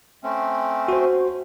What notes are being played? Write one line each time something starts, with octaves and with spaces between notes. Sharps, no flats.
A3 C4 C#4
F#4 C5